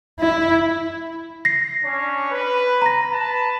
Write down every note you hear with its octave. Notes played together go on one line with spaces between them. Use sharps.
E4
A#6 C7
C#4 D4 C#5
B4
A#5 A#6
B4 A5